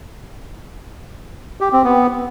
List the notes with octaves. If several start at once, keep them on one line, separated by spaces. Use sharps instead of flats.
G4
C4
B3